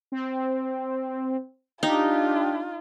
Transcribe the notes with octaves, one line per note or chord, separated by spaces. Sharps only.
C4
D4 D#4 F4 G4